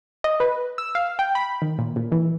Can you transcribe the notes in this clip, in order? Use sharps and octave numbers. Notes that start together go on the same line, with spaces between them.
D#5
B4
E6
F5
G5
B5
D#3
A#2
A#2
E3